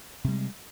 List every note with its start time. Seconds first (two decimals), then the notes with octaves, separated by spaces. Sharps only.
0.24 C3
0.28 G3
0.32 G#3